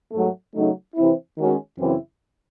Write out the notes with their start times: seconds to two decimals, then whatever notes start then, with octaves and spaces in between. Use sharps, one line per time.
0.11 G#2 F#3 A3
0.54 C#3 F#3 A3 D#4
0.95 C3 E3 C4 E4
1.37 D#3 G#3 C#4 F#4
1.79 F#2 C#3 E3 C4 E4